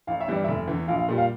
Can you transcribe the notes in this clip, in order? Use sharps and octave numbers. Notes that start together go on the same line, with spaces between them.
A1 F5
E5
G2 E3 G3 D5
F1 E5
E2 E3
A#1 F5
F5
A#2 G3
F5